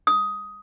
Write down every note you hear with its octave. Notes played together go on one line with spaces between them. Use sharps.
D#6